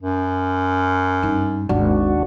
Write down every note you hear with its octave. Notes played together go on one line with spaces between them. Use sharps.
F#2
G2 D#4
G#1 D#2 D4 F#4